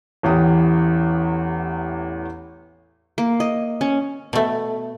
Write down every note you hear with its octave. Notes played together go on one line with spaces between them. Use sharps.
A1 E2 G4 D#6
A#3
D#5
C#4
B2 A3